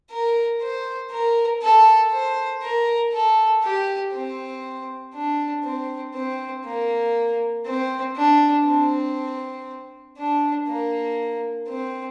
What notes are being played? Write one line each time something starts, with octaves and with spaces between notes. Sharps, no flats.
A#4
C5
A#4
A4
C5
A#4
A4
G4
C4
D4
C4
C4
A#3
C4
D4
C4
D4
A#3
C4